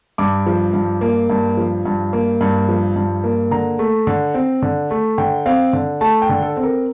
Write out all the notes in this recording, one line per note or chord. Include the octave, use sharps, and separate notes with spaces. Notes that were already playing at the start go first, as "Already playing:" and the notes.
G2 D6
F3
G2
A#3
G2
F3
G2
A#3
G2
F3
G2
A#3
D3 A#5
A3
D3
C4
D3
A3
D3 G5
C4 F5
D3
A3 A5
G5
D3
A4
C4
A#4